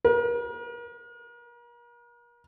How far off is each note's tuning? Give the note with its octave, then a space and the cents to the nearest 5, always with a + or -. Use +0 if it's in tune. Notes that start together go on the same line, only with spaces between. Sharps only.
A#4 +40